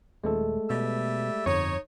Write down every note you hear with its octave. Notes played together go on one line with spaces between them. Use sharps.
D#1 G#3 A3 A4
B2 G3 E5
G1 F2 D#4 C#5 C#6